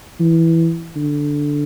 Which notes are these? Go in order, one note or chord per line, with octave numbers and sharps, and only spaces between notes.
E3
D3